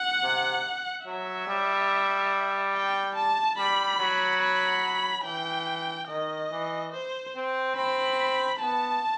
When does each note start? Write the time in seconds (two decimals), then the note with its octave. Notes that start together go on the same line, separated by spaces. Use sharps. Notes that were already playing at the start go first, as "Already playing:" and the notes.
Already playing: F#5
0.23 C3
1.06 F#3 E5
1.47 G3
2.74 G5
3.16 A5
3.58 G3 B5
3.99 F#3
4.41 B5
5.25 E3 G5
6.08 D#3 D#5
6.51 E3
6.92 C5
7.35 C4
7.76 C4 B5
8.60 B3 A5